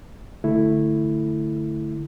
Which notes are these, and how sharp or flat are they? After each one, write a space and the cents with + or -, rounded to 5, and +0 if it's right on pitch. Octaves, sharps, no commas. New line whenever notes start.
D3 +0 A3 +0 E4 +0